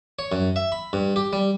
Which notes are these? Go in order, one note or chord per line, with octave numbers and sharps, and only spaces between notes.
C#5
F#2
E5
B5
G2
G4
G3